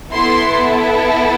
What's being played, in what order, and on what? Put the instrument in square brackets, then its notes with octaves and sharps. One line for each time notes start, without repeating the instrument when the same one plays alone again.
[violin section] B3 E4 A4 C6